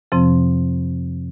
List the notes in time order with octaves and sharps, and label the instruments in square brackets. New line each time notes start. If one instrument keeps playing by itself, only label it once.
[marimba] F2 C3 F3 C4